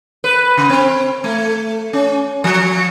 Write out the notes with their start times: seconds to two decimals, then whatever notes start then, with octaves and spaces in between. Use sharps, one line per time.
0.24 B4
0.57 C#3
0.69 C4
1.24 A3
1.93 C#4
2.44 F3